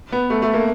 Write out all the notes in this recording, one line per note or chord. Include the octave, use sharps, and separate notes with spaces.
B3
A3
A3
A#3